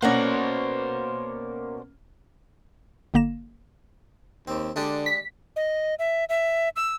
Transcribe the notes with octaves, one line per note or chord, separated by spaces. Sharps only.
B2 A#3 C#4 A#4 C5 D5 F#5
G1 D3 A#3 A#6 E7
D#2 C4
D3 G#3 D4 G4
B6
D#5
E5
E5
E6